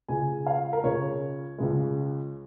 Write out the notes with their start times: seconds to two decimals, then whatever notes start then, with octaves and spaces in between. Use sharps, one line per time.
0.08 C#2 C#3 G#3 G#5
0.46 F5
0.73 A#4
0.83 C#2 C#3 G#3 C#5
1.58 C#2 C#3 G#3